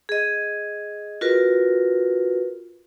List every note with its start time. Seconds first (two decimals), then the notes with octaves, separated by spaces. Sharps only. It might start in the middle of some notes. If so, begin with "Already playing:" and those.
0.09 G#4 D#5
1.21 F4 F#4 A#4 B4